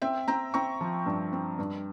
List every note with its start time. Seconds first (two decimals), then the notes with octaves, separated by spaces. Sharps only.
0.02 C4 E5 G5
0.28 C4 G5 A#5
0.54 C4 A#5 C#6
0.81 F3
1.06 G2
1.32 C4
1.59 G2